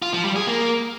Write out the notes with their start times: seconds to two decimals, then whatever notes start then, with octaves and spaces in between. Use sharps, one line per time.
0.02 F4
0.14 F3
0.25 G3
0.36 G#4
0.47 A#3